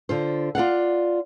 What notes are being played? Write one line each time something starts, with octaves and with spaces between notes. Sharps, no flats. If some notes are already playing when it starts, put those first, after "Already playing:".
D3 F4 C5
F4 D5 F5 F#5